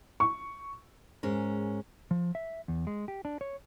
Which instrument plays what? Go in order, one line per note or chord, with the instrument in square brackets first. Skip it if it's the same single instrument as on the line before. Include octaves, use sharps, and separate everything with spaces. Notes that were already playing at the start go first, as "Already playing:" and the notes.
[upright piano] C#6
[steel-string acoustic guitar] G#2 G#3 C#4 A#4
[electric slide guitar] F3
E5
E2
G#3
G4
D4
C#5